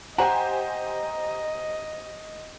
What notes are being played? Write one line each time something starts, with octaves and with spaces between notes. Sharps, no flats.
G4 C5 D#5 F#5 G#5 A#5